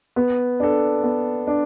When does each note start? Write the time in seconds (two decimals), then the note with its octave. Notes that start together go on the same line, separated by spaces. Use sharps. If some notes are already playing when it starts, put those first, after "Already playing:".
0.16 B3
0.60 D4 A4
1.03 B3
1.47 D4